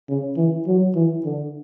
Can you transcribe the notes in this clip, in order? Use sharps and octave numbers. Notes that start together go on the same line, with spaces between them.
C#3
E3
F#3
E3
D3